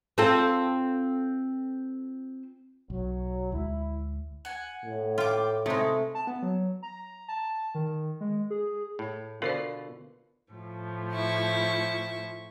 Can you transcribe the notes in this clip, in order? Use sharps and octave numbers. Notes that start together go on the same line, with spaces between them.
C4 F4 A4
B1 F#3
D2 G#3 E4
F#5 G#5
A2
F4 G5 D6
C3 G#3 A3 D#4
A5
B3
F#3
A#5
A5
D#3
G#3
G#4
A2
B2 D3 F4 A#4 C5 D5
A2 F3
E4 C#6